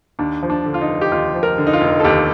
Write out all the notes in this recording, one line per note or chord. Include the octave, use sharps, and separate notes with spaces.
D#2 D4
F3
D4
D3
F4
D#4
F1
G4
D#2 F4
F3
A#4
D3
D#4
F4
F1
A4
D#2 G4